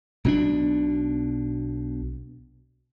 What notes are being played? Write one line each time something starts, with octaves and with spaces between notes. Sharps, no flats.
B1 B2 C4 D4